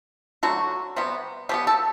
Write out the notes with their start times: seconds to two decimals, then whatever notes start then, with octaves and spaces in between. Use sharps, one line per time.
0.43 D3 F#3 A3 F#4
0.96 C3 G3 B3
1.49 B2 G3 B3 G4
1.67 A4